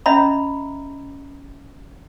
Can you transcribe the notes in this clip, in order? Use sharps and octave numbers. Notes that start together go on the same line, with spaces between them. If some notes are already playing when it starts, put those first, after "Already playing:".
C#4 D#5 E5 A#5 B5